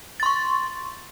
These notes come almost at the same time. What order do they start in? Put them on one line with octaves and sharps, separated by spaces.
A6 C6 C#6